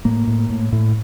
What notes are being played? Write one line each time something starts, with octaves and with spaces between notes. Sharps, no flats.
A2 A#3
A2
A2
A2